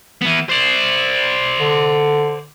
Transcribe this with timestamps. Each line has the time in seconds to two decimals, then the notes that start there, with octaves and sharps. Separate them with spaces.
0.21 E3 B3
0.49 C5 D5
1.60 D3